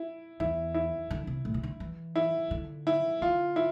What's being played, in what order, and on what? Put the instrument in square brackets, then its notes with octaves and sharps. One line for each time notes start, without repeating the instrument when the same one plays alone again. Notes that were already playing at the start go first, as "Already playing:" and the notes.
Already playing: [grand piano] E4
[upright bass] E2 [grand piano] E4
[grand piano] E4
[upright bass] D3
C3
A2
C3
D3
E3
[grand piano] E4
[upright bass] D3
[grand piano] E4
[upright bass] D3 [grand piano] F4
[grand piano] E4